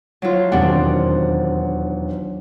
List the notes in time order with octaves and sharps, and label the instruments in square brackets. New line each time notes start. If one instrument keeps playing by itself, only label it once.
[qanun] F3 E4 A5 [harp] F#3 F4
[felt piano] E1 D#2 F#5 [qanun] D#3 F3 C4 [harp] D4